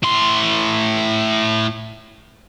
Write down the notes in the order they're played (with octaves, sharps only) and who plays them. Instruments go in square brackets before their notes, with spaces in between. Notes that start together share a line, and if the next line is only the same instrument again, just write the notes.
[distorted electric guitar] A2 C6